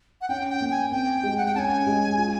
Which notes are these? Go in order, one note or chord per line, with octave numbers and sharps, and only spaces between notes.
F#5
C#4 G5
G5
A#3
G#5
C4 G5
G#3
F#5
G5
C#4 G#5 A5
G#3
F4